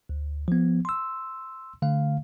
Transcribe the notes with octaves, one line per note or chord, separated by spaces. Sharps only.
D2
F3 B3
C6 E6
D3 A3 F5